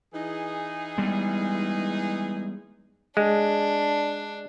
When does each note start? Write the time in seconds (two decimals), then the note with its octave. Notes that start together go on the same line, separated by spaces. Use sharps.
0.14 E3 D#4 G#4
0.98 G3 G#3 B3
3.17 G#3 D4